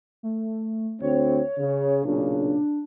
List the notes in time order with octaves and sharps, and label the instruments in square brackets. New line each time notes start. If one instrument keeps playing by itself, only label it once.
[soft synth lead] A3
[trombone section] D2 C4 [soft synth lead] C#5
[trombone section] C#3
[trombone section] B1 A#2 C#3 [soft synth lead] D4